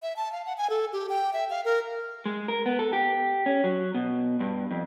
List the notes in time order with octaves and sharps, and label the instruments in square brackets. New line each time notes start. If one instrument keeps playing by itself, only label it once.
[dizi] E5
A5
F5
F#5
G#5
A4
G4
G5
E5
F5
A#4
[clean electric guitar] G#3
A#4
B3
A4
G4
C#4
F#3
B2
G2
F2